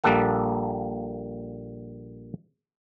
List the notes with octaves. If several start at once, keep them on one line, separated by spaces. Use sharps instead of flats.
A#1 G3 A#3 A4 F#5